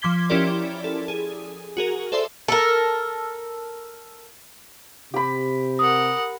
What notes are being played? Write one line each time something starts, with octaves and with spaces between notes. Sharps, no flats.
F3 C6 D6 G#6 B6 G7
F3 C#4 E4 G4 A#4 D5
A4
G#4
F#4 G#4 A#4
A4 C5 D5 E5 C6
A4 A#4
C3 G4 B5
A#4 F#5 D#6